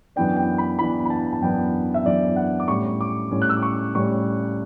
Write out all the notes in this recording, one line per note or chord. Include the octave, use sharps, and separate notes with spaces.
F#2 E3 B3 D4 G5
G5
B5
F#2 E3 B3 D4 B5
B5
A5
A5
F#2 E3 B3 D4 G5
E5
F#2 E3 B3 D4 D5
F#5
D6
A2 G3 C#4 C#6
D6
A2 G3 C#4
F#6
E6
D6
C#6
A2 G3 C#4 C#6